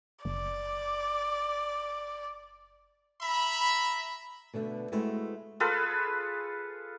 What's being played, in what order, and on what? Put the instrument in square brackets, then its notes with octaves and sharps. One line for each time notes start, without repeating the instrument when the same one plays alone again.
[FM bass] F#1 [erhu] D5
[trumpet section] E5 A#5 B5
[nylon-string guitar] B2 D3 A3
G#3 A3 B3 C4 E4 F#4
[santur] F4 G#4 A4 B4